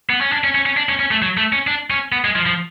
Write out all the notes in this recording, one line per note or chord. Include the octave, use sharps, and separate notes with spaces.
B3
C#4
D4
C#4
C#4
C#4
D4
C#4
C#4
A3
F#3
A3
C#4
D4
C#4
B3
G#3
F3
F3